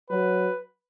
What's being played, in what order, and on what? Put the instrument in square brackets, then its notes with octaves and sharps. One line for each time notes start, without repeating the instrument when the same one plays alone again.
[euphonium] F#3 [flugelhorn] B4